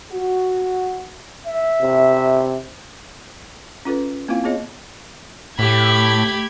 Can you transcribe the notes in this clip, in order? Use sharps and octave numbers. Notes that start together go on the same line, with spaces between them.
F#4
E5
C3
C#4 F4 A4 B4
A#3 C4 E4 F4 F5
B3 F4 G#4 C#5 D#5
A2 A3 G4 B5 G#6